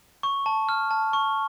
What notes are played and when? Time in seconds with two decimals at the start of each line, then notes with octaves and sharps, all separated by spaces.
0.23 C#6
0.46 A5
0.69 F6
0.91 A5
1.13 C#6